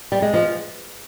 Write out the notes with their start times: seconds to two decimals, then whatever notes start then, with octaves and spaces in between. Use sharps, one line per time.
0.12 G3
0.22 G#3
0.33 F3